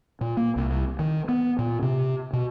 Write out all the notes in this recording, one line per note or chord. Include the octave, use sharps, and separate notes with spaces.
A#2
A#3
C2
D#3
B3
A#2
C3
B2